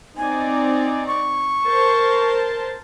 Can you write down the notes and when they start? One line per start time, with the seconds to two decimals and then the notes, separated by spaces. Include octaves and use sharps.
0.17 C4 D#4 D5 G#5
1.07 C#6
1.66 A#4 C5 A5